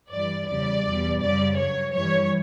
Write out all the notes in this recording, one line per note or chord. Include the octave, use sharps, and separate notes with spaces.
G2 E3 G3 D5
E2 C#3 G3 D5
E2 B2 G3
F#2 C#3 G3 D5
G2 F#3 C#5
G2 E3 G3 C#5